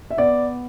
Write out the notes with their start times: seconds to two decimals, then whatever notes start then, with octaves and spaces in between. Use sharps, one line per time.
0.11 E5
0.18 B3 D5